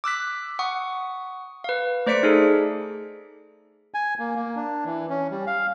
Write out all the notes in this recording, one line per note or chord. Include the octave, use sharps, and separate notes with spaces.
D6 E6 F#6 B6
F#5 C#6 D#6
B4 F5
A3 C5 D5 B6 C#7 D7
D#4 G#4 A4
G#5
A#3
A#3
D4
E3
C#4
G3
F5